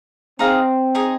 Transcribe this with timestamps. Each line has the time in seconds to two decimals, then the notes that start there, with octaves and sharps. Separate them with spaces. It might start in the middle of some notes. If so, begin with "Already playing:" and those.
0.39 C4 D#4 G#4 F5 A#5
0.95 D#4 G#4 D#5